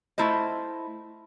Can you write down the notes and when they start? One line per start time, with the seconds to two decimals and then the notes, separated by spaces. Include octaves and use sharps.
0.18 A3 E4 F4 C5 D#5